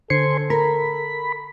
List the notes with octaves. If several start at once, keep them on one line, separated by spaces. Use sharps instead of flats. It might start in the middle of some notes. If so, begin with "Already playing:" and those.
D3 A4 C5 G#5 C6 C#7
A#4 A#5 B5